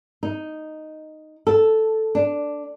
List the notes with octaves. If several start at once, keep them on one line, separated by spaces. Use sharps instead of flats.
D#4
A4
D4